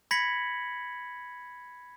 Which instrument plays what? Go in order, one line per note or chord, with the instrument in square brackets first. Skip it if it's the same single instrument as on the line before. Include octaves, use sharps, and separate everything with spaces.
[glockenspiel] B5 G#6 A#6 B6 C#7 F#7